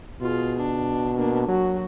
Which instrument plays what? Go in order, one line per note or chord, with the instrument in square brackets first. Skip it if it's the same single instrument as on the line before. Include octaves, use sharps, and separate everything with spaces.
[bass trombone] B2 [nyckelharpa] F4 G#4
[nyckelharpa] D4
A#3 D4
[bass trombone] F#3 [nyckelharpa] F#4